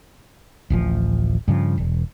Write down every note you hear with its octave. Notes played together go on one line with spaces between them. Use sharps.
D1 A1 F3
G2 C#3 F3
E1